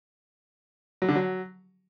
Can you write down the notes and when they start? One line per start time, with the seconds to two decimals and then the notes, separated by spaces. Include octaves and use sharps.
1.02 F#3
1.09 D3
1.15 F#3